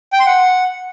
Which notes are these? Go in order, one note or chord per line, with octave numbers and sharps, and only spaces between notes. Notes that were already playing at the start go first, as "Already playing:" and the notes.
G5
C6
F#5